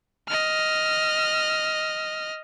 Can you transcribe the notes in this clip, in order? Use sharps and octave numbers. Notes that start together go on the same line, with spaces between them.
D#5 F6